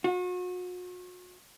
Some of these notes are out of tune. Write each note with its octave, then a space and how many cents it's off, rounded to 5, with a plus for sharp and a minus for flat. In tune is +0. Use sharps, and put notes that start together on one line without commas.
F#4 -40